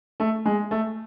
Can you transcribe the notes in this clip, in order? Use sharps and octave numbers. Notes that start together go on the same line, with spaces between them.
A3
G#3
A3